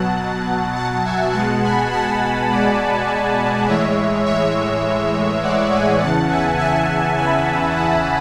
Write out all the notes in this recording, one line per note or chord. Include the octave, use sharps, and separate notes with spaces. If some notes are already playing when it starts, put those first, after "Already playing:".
Already playing: B2 F#3 F#5 A5
F#5 A5
E5 G#5
B2 G#3 F#5 A5
G#5 B5
F#5 A5
D5 F#5
A2 E3 G#3 C#5 E5
C#5 E5
D5 F#5
E5 G#5
E2 C#3 E3 F#5 A5
E5 G#5
E5 G#5
G#5 B5
F#5 A5